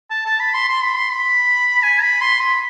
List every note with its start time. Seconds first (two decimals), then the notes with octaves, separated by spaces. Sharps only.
0.11 A5
0.26 A5
0.40 B5
0.54 C6
0.69 C6
0.83 B5
0.98 C6
1.12 B5
1.83 G#5
2.03 B5
2.21 C6
2.40 B5